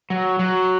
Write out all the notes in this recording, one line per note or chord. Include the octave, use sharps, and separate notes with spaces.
F#3
F#3